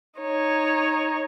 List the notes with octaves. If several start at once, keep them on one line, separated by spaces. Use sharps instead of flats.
D#4 C#5